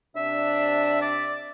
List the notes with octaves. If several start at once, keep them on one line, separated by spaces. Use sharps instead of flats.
C3 D4 E5
D5